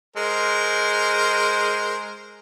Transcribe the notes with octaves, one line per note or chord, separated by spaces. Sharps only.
G#3 A#4 C5